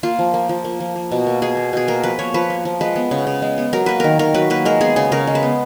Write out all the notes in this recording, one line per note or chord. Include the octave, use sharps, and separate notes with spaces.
A#3 F4
F3
A#3
F3
A#3
F3
A#3
B2
A#3
B2 G#4
A#3
B2 G#4
A#3 A#4
F3 B4
A#3 C#5
F3 B4
A#3
F3
G#3 B4
B3
C#3
C#3
G#3
B3
F#3 A#4
A#3 B4
D#3 A#4
D#3 A#4
F#3 B4
A#3 B4
G#3 A#4
B3 G#4
C#3 G#4
C#3 A#4
G#3
B4
B3